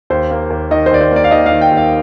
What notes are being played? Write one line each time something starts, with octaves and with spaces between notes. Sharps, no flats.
D#2 C5
A#3
D#2
D#3 D#5
C5
D#2 D5
C5
A#3
D5
F5
D#2 D#5
F5
D#3
G5
D#2
F5